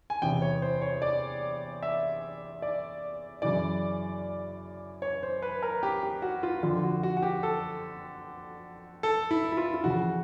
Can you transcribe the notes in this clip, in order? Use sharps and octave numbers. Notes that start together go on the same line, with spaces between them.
G#5
E2 C3 E3 G5
C#5
C5
C#5
D5
E5
D5
F#2 C#3 E3 D5
C#5
C5
B4
A#4
G4
G4
F#4
F4
F2 D3 F4
F#4
F#4
F#4
G4
A4
A4
E4
E4
F4
F4
F2 C#3 E3 F#4